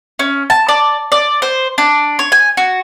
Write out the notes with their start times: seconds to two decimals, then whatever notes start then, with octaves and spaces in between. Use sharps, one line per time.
0.19 C#4
0.50 A5
0.69 D5
1.12 D5
1.42 C5
1.78 D4
2.19 C#5
2.32 G#5
2.57 F#4